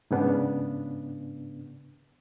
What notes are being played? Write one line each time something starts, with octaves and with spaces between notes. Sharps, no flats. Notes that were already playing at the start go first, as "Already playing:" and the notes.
G#2 C#3 B3 D4